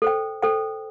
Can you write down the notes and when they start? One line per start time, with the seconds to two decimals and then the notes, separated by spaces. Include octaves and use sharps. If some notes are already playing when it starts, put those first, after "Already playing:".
0.02 A4 C5 G5
0.43 A4 C5 G5